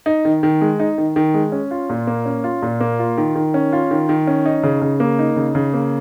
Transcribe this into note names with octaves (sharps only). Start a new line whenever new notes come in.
D#4
D#3
D#3
G#3
D#4
D#3
D#3
G#3
C#4
F4
A#2
A#3
C#4
F4
A#2
A#3
F4
D#3
D#3
C#4
F4
D#3
D#3
C#4
D#4
C#3
C#3
A#3
D#4
C#3
C#3
A#3